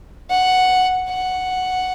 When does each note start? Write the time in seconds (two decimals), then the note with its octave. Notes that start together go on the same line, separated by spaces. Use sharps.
0.30 F#5
1.09 F#5